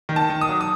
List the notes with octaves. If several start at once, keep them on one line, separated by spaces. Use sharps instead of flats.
D#3
A5
D#3
D#6
F#3
D#6